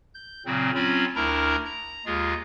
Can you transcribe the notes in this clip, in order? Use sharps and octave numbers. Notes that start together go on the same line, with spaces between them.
G6
A#2 C#3 F#3 C4
F#3 C4 C#4 F4 B5
D2 D4 E4 A#4 A#5
A#5
D#2 G#3 F4 G#4